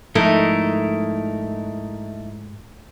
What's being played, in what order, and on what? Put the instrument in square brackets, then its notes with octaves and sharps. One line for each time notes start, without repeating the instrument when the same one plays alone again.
[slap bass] G#2 F3 [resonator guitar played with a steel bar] A3 [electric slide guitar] D#4 E4 A#4